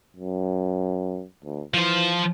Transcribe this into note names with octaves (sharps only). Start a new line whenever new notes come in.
F#2
D2
E3 F3 C5